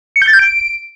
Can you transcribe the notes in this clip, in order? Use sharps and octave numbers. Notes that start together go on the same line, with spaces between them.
C#7
G6
A6
G6
D7